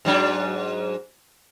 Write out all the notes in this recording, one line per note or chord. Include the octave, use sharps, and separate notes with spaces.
G#2 F#3 D4